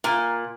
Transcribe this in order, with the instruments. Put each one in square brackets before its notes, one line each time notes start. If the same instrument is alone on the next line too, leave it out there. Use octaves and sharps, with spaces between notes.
[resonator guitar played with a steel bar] A#2